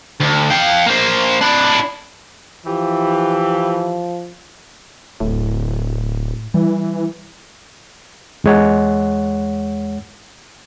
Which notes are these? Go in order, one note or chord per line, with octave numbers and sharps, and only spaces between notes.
D2
F5 G5
A#3 C5
D4 E4
E3 F3 G4
D1 A2
E3 G3
E2 G#3 C#5 F#5